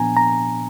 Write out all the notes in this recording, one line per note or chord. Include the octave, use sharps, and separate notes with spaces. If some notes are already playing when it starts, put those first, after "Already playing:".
Already playing: A#2 F3 B3 D4 G#5 A#5
A#5